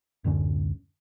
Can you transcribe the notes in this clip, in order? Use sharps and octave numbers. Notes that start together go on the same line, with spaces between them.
D1 F#2 D3 C#4